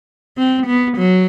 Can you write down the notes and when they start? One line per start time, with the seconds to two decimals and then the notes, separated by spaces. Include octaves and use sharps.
0.37 C4
0.66 B3
0.97 F#3